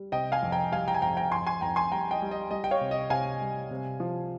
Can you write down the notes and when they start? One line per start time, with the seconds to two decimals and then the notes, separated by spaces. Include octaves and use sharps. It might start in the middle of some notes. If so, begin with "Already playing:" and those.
Already playing: G3
0.12 C3 D#5 G5
0.32 F5 G#5
0.43 F2
0.52 G5 A#5
0.72 G3 F5 G#5
0.88 G5 A#5
0.94 G#5
1.02 F2 G5 A#5
1.17 G5 A#5
1.32 F2 G#5 C6
1.47 G#5 C6
1.61 F2 G5 A#5
1.76 G#5 C6
1.92 G3 G5 A#5
2.11 D#5 G5
2.22 G3
2.31 D#5
2.51 G3 D#5
2.64 G5
2.71 C#5 F5
2.81 C3
2.91 D#5
3.10 C3 F5 G#5
3.41 G3
3.71 C3
4.00 F3